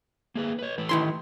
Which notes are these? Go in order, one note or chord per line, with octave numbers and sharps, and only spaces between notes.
A#3 G#4 B4
B4 C#5
E3 A3 B4
D#3 E4 C6